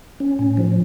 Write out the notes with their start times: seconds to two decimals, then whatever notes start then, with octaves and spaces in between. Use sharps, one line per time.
0.20 C#4
0.39 A2
0.57 F3